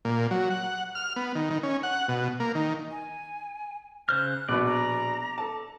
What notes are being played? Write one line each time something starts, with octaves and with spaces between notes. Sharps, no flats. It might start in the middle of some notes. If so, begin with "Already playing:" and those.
A#2
F#3
F#5
F6
B3
D#3
D#3
C#4
F#5
B2
A#3
D#3
G#5
C#3 C5 F6 F#6
A#1 B2 B3 D5
A#5
A4 A5